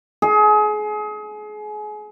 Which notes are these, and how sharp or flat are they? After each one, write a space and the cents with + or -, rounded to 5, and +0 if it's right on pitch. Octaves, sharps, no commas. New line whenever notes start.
G#4 +30